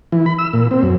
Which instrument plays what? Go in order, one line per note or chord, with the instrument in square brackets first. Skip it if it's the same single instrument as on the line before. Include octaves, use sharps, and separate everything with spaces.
[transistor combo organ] E3
B5
E6
A#2
C4
F#2